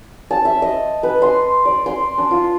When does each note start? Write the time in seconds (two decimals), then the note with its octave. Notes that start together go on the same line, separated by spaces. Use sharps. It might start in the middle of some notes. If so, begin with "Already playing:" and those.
0.31 A5
0.45 E5
0.62 D#5
1.03 B4
1.22 C6
1.65 D5
1.86 C6
2.18 D4
2.31 F4